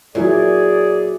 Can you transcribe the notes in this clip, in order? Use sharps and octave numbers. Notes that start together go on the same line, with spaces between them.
A#2 F#3 E4 G#4 C#5 D5